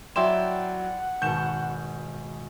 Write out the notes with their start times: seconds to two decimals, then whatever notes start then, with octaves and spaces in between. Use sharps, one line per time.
0.16 F#3 E4 D5 F#5 G5 C6 E6 E7
1.22 G#1 B2 C#6 G6 E7